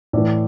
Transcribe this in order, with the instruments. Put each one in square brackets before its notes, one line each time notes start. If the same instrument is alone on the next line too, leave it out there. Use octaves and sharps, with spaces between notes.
[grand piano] A2 E3 D5